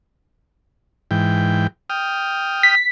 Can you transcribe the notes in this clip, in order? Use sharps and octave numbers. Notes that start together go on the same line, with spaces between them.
G#2 E3 G5
G5 D#6 F6
B6